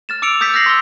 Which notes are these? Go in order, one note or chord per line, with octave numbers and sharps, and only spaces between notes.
F6 A6 E7
D6 E6 C#7 D7 F7
D#6 G6 A6 B6
F6 G6 A#6 C7 F#7
C6 E6 G7